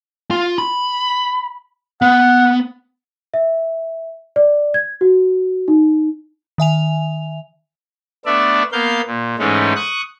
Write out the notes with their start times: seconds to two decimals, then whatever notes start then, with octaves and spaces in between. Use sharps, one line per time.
0.31 F4
0.58 B5
2.02 B3 F#5
3.34 E5
4.36 D5
4.74 G#6
5.01 F#4
5.68 D#4
6.58 D#3 E5 G#5 F7
8.26 A3 B3 D4 D5 E5
8.72 A#3 B3 F5 G6
9.06 A#2
9.39 G#2 E3 G#3 A3 C#4 D#4
9.76 C#6 D#6 F#6